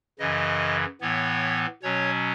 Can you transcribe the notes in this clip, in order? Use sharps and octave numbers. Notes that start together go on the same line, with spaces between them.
F#2 C#3 E3 D#5
A2 E3 B3 C#5
B2 F#3 C#4 C#5